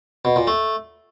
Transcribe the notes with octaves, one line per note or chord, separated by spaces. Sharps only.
B2
A#2
A3